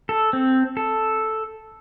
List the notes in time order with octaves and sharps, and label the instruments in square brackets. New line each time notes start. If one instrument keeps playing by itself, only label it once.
[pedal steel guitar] A4
C4
A4